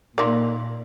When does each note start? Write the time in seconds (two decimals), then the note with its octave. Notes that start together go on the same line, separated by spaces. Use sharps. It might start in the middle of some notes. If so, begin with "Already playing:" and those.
0.18 A#2 D#4 A#4 D5 F5 C6